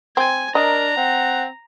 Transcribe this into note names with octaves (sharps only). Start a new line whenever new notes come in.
C4 G#5
D4 A#4 D#5 A#5
C4 F#5